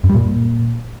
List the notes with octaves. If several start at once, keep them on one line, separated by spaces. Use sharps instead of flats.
F#2
G3
A#2